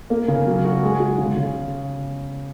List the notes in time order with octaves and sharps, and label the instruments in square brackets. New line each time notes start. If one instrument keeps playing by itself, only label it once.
[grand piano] A#3
C#3
F#3
F#4
G#3
F#4
C#3
C#3